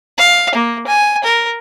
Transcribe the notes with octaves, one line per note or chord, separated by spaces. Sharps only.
F5
A#3
G#5
A#4